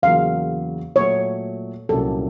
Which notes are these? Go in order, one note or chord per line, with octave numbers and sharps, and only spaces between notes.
E2 C#3 F#3 A#3 F5
A#2 F#3 A3 C#5
C2 A#2 F#3 A#3 C#4 A4